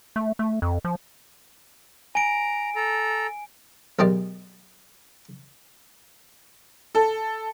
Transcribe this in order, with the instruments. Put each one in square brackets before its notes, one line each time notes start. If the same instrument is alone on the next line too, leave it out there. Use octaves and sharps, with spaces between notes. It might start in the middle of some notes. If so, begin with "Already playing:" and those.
[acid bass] A3
A3
F2
F3
[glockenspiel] G#5 D7 [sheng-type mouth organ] A#5
[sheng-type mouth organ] A4 A#5
[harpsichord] B1 D#3 G#3 G4 D5
[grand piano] A4